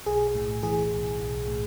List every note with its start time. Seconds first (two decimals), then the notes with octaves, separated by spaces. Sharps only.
0.06 B1 G#4
0.35 A2
0.63 E3 G#4
0.92 B1
1.20 B1
1.48 A2